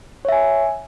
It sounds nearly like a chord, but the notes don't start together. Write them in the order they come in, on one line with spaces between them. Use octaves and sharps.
C#5 E5 G#5